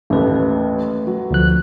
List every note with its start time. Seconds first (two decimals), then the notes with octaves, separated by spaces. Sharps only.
0.10 A1 D#2 A3 B4
1.07 F#3
1.31 D2 F3 F#6